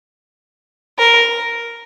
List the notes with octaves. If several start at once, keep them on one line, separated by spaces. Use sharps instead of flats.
A#4